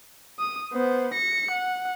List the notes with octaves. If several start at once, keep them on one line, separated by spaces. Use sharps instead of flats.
D#6
B3 C5
A#6 C#7
F#5